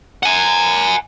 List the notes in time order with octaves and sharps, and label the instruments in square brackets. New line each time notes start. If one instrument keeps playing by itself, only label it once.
[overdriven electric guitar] F#5 G#5